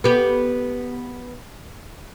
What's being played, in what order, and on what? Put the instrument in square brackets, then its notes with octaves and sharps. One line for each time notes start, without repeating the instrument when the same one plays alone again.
[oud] B3 G4